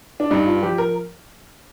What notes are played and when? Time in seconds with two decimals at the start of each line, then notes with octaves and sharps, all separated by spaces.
0.20 D4
0.30 G2 D#4
0.47 F4
0.63 F3 G4
0.78 A#4